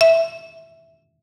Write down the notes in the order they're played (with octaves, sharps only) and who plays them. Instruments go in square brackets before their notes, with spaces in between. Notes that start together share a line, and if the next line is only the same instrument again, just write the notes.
[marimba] E5